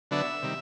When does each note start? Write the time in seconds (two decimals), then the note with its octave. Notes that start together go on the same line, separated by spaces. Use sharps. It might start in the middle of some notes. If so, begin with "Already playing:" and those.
0.11 D3 F#3 B3 D4 E5
0.42 C3 D#3 G3